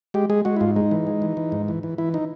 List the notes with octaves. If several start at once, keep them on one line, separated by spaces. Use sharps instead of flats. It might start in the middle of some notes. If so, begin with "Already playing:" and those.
G#3 G4
G#3 G#4
G#3 F#4
E4
G#2 F4
G#3 D#4
E3
G#3
E3
E3
G#2
E3
E3
E3 E4
D#4